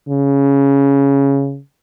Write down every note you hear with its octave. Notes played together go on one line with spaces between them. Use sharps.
C#3